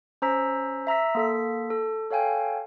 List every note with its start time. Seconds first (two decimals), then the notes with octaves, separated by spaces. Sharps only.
0.22 C#4 C5 A#5 E6 B6
0.87 E5 A#5 E6 B6
1.15 A#3 A4 B6
1.70 A4
2.10 A4 C#5 F5 G5 G#5